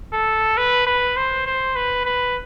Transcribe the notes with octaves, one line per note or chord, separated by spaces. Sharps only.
A4
B4
B4
C5
C5
B4
B4